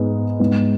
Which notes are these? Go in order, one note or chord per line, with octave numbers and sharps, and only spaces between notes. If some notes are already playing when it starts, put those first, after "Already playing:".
Already playing: G#2 G#3 B3
G#2 G#3 B3